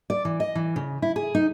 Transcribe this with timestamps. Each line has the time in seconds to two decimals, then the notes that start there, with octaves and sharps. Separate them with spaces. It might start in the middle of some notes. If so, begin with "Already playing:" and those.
0.10 D5
0.25 E3
0.40 D#5
0.55 E3
0.76 C#3
1.02 E4
1.16 G#4
1.35 D#4